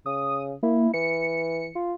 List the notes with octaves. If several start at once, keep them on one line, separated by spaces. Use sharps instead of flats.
C#3 D#6
A#3 E4
E3 C#7
F4